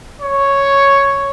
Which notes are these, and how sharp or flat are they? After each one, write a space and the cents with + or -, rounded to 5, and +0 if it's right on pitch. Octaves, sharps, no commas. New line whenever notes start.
C#5 +0